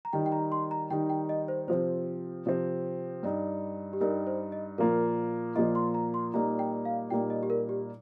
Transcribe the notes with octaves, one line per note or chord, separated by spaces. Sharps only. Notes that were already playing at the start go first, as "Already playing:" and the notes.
A#5
D#3 G3 D#4 G5
G5
A#5
C6
A#5
D#3 G3 D#4 G5
G5
D#5
C5
C3 F3 C4 C5
C3 F3 C4
G2 G3 D#4
G4
G2 G3 D#4 A#4
C5
D#5
A#2 F3 A#3 F4 A#4
A#2 F3 A#3 F4 D#5
C6
A#5
C6
A#2 G3 A#3 D#4 A#5
G5
F5
A#2 G3 A#3 D#4 G5
D#5
G4
A#4
G4